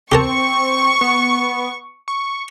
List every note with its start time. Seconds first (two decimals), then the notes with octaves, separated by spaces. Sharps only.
0.12 C4 G4 A#4 A5 C#6
1.01 B3
2.08 C#6